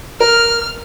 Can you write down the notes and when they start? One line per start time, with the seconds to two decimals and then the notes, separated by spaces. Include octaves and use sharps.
0.20 A#4 F6